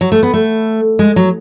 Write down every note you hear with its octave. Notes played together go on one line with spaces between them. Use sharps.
F#3
A3
B3
A3
G#3
F#3